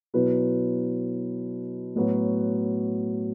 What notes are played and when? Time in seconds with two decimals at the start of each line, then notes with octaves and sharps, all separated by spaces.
0.14 B2 F#3 B3 E4 B4
1.96 A2 F#3 B3 F#4